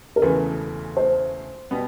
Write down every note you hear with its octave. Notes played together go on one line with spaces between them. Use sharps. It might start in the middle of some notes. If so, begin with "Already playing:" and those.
A#4
E1 D2 C#3 E3 A3 B4
C5
B2 G3 B3